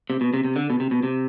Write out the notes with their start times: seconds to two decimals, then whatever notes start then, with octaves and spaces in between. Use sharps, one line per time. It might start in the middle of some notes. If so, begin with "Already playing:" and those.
0.10 C3
0.21 B2
0.34 C3
0.44 C3
0.56 D3
0.70 B2
0.80 C3
0.91 B2
1.03 C3